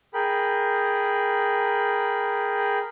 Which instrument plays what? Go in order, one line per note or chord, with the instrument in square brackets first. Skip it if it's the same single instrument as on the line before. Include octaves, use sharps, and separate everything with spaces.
[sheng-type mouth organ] G#4 A#4 G5 B5